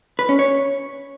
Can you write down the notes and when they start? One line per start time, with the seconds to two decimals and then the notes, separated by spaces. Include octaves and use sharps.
0.19 B4
0.29 C#4
0.39 C#5